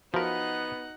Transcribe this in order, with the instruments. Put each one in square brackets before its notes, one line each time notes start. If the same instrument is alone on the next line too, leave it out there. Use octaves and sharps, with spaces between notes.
[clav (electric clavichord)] F3 A#4 [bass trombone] B3 [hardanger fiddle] D#4 F#5 [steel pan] F#4 E5 B5